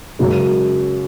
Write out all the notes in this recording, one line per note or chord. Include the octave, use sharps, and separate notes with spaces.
F#2 C#3 G#3